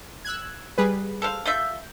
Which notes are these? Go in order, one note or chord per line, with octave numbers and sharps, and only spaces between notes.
E6 F#6 G#6
G3 G#4 B4
A4 C5 F5
A3 F4 E5 G6